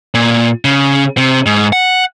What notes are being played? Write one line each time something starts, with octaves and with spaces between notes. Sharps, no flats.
A#2
C#3
C3
G#2
F#5